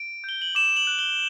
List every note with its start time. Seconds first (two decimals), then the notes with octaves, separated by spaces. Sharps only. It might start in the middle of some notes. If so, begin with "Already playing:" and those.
Already playing: D7
0.24 G6 G7
0.41 F#7
0.55 D6 E7
0.76 F#7
0.87 F#6
0.99 G7